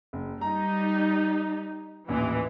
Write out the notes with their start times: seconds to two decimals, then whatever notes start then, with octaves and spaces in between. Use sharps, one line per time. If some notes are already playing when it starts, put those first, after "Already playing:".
0.13 F#1
0.41 G3 D#4 A#5
2.08 A1 D#2 A#2 E3